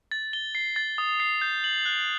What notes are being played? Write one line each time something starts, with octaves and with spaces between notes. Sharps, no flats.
A6
G7
C7
A6
D#6
C7
G6
F#7
F#6